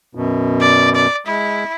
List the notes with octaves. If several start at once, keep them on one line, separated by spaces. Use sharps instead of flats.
F#2 B2
D5
D5
G#3 E4